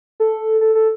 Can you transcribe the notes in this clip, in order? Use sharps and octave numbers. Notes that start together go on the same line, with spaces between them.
A4
A4
A4